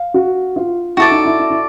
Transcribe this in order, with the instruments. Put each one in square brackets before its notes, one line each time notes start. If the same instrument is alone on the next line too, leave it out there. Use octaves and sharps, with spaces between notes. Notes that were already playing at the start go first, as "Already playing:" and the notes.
Already playing: [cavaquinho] F5
[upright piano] F#4
F4
[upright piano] E4 [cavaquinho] F#4 A4 D5
[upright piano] D#4
E4
E4
E4